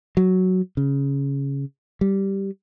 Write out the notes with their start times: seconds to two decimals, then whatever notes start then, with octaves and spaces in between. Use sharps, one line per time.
0.17 F#3
0.77 C#3
2.01 G3